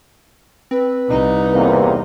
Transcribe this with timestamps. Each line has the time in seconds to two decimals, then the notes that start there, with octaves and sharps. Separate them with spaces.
0.71 C4 B4
1.08 C2 D#4
1.53 E2 C3 A#3